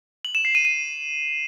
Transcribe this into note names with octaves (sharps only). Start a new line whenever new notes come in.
F#7
E7
C7
D#7
D#7